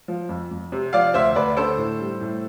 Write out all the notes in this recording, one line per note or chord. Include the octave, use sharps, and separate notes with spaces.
F3
F2
F2
C3
F3 D5 F5
D2 C5 E5
D2 B4 D5
D3 A4 C5
A2
G3
A2